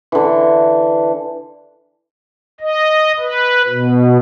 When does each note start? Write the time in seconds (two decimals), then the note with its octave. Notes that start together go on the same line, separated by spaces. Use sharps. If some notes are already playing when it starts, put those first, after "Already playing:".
0.12 D3 E3
2.60 D#5
3.19 B4
3.68 B2